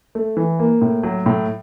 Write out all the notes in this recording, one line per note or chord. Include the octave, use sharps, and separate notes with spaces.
A3
E3
A#3
A2
F#3
A2